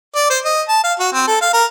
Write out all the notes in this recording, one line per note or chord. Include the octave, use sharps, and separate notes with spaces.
D5
C5
D#5
A5
F5
F#4
C4
A4
F5
A#4